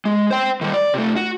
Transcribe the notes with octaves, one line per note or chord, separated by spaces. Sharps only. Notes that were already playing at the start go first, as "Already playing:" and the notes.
G#3
C5 G5
D#3 G3
D5
C3 A3
F#4